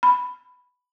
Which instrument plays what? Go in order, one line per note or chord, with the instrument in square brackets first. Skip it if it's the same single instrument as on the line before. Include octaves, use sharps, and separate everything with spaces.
[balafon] B5